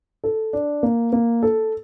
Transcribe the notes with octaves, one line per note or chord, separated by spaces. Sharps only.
A4
D4
A#3
A#3
A4